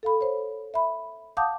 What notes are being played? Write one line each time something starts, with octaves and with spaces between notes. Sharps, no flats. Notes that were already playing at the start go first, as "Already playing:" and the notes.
A4 F5 B5
C5 C#5
E5 B5
F5 F#5 A5 D6 D#6 G6